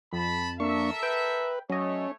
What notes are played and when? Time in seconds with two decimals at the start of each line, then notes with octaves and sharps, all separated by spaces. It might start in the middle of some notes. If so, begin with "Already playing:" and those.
0.13 F2 A5 B5
0.60 A#3 D4 A4 A#4 E5 C#6
1.03 B4 G5
1.70 F#3 A3 C#4 C#5 D#5